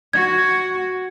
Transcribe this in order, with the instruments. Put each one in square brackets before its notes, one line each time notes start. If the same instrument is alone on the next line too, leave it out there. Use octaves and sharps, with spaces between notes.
[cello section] F#4 [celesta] G#6